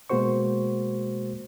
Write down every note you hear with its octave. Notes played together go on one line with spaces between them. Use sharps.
B2 G#3 A#3 F#4 C5 C#6